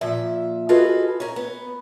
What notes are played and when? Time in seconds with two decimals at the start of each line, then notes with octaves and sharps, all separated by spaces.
0.01 A#2 F3 E5
0.69 F4 F#4 G#4 A4 B4 D#5
1.20 C#4 A#4
1.36 B3